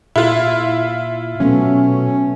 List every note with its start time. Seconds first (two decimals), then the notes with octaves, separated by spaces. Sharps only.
0.16 A#2 E4 F4
1.40 B2 F#3 A3 B3 C#4